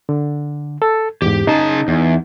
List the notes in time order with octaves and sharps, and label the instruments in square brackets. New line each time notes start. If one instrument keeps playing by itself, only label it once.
[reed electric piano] D3
A4
[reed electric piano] E2 G#2 [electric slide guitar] G4
[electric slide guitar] C#3 G#4 A5 [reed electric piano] D#4
[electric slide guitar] E2